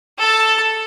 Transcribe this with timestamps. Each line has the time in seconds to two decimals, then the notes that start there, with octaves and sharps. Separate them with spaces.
0.18 A4 A5